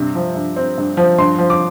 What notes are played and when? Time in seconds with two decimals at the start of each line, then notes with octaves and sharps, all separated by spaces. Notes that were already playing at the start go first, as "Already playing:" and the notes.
Already playing: G2 C3
0.15 F3
0.35 G2
0.56 C4
0.78 G2
0.97 F3
1.18 G2 C6
1.38 F3
1.50 D6